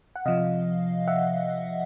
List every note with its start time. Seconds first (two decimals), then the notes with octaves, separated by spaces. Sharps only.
0.16 F#5
0.25 C3 F3 D#5 F5
1.08 E5 F#5